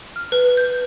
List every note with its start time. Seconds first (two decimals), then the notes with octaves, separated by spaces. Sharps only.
0.16 F6
0.32 B4
0.57 G6